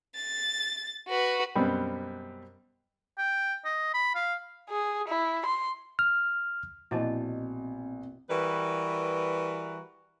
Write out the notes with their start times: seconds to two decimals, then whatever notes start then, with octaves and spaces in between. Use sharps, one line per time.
0.15 A6
1.08 F#4 B4
1.55 F#2 B2 G3 B3 C4
3.18 G5
3.65 D#5
3.94 B5
4.15 F5
4.69 G#4
5.08 E4
5.45 C6
5.99 F6
6.91 A#1 B2 C4 E4 C5 D5 D#5 A5
8.29 E3 G3 F#4 A#4 B4